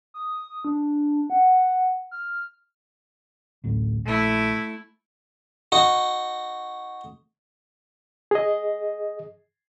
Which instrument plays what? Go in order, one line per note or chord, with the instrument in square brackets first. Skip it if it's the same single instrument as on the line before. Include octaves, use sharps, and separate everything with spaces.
[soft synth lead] D#6
D4
F#5
F6
[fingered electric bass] A1 D2 A2
[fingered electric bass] A#1 [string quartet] A3 E4
[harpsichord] D#4 F#4
[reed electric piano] G#4 D#5